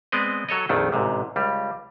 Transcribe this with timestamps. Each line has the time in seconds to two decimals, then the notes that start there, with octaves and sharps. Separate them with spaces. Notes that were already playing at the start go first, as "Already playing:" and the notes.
0.12 G#3 B3 C4 D5 D#5
0.49 F#3 A4 C#5 D#5
0.69 A#1 F2 D#3 A3
0.92 A1 G#2 C3
1.36 C#2 G3